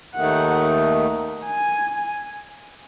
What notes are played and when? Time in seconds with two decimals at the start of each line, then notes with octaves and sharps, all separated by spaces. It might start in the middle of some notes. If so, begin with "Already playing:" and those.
0.15 D#2 D#3 A3 D#4 F#5
1.46 G#5